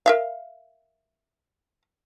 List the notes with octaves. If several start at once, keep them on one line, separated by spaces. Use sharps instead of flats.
A#4 E5 F5